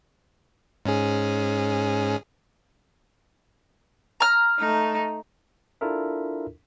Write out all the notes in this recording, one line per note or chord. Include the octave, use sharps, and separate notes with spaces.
G#2 C#4 G#4
A#5 F6
A3 D#4
D4 E4 F4 A4 A#4 E5